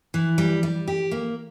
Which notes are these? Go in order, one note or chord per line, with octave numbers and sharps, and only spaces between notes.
E3
G3
G3
G4
A#3